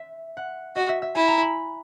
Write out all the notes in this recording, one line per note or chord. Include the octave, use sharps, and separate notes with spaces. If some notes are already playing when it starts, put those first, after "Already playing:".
Already playing: E5
F#5
F#4 D#5
E5
E5
E4 G#5
A#5
B5